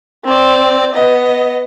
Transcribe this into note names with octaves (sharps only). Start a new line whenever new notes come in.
C4 D5
B3 D#5